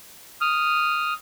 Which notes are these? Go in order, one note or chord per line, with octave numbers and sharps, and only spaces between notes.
D#6 F6